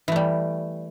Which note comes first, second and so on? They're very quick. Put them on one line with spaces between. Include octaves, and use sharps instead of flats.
E3 A3 G3